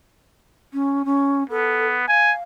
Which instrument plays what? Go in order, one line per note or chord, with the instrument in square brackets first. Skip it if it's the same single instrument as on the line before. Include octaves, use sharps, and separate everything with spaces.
[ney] C#4
C#4
[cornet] B3 [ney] A4
[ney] F5 [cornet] G#5